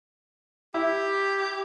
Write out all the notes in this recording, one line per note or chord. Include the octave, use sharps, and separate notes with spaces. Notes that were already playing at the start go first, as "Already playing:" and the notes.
E4 G4